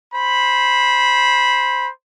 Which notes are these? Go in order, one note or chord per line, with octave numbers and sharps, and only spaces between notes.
C5 B5